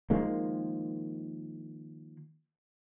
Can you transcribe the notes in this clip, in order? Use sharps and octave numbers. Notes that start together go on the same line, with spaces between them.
D#3 F3 G#3 A#3